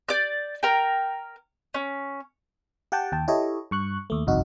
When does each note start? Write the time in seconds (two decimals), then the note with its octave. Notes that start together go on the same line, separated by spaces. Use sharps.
0.09 D5 G6
0.63 A#4 G5
1.74 C#4
2.92 G4 F#5 G5 A5
3.12 D#2 G5 A5
3.28 E4 G4 A4 C#5 D#5
3.71 G2 C#6 F#6
4.10 D#2 A3
4.27 G1 C2 F2 D#4 F#4